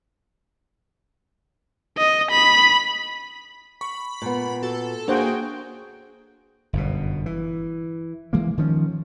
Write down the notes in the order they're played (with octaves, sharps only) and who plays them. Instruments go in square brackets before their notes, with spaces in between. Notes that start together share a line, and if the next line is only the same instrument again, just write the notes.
[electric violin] D#5
B5
[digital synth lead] B5 [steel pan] C#6
[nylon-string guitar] A#2 B3
[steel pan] F#4 [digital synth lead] A4
[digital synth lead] A#3 [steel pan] D4 C5 F#5 [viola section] F#4 G#4 G5
[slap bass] G1 F#2 B2
E3
E3 G#3 A#3
D#3 F3 A3 C#4